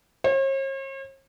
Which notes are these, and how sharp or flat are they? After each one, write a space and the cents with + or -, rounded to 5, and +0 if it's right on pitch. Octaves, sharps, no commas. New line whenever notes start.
C#5 -45